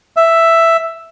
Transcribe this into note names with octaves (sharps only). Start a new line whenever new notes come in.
E5